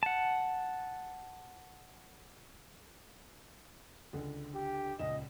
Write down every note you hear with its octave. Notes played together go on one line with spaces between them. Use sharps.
F#5 A5
C#2 D3
G4
D#1 C#2 D#5 E7